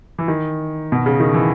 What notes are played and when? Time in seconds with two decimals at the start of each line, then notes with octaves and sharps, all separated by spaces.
0.18 E3
0.28 D#3
0.92 B2
1.06 C#3
1.20 D#3
1.34 E3